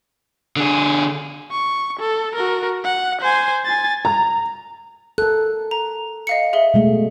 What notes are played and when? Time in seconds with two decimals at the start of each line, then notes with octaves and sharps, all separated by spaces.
0.56 D3 G#4
1.52 C#6
1.99 A4
2.35 F#4 A#4
2.84 F#5
3.21 C5 G#5
3.65 G#5 A6
4.05 A#5
5.18 A4 A#4 F#6
5.71 A#5
6.27 D#5 F5 C#7
6.53 G#4 E5 G7
6.74 B2 G#3 A3